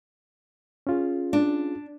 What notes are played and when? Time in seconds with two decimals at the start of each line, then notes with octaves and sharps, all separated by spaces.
0.87 C#4 F4 G#4
1.33 D4